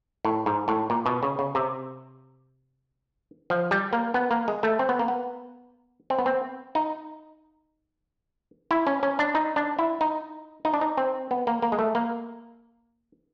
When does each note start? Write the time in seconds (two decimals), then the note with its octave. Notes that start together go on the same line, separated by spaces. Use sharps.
0.25 A2
0.46 G#2
0.68 A2
0.90 A#2
1.06 B2
1.23 C#3
1.39 C#3
1.55 C3
3.50 F3
3.71 G3
3.93 A#3
4.14 B3
4.31 A#3
4.48 G#3
4.63 A3
4.79 C4
4.89 B3
4.99 A#3
5.08 B3
6.10 C4
6.18 B3
6.26 C4
6.75 D#4
8.71 E4
8.87 C#4
9.03 C#4
9.19 D4
9.35 D#4
9.56 D4
9.79 E4
10.01 D#4
10.65 D#4
10.74 D4
10.81 D#4
10.97 C4
11.31 B3
11.47 A#3
11.62 A#3
11.72 G#3
11.79 A3
11.95 A#3